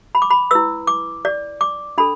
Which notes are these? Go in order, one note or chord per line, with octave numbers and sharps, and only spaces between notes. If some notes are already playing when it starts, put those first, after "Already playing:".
B5
D6
B5
E4 B4 E6
D6
D5
D6
D4 A4 B5